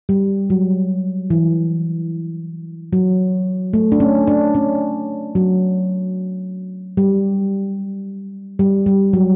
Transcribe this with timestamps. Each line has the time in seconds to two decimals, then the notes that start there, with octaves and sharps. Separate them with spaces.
0.09 G3
0.50 F#3
1.30 E3
2.93 F#3
3.73 A3
3.92 D4
4.00 C#4
4.27 D4
4.55 C#4
5.35 F#3
6.97 G3
8.59 G3
8.86 G3
9.13 F#3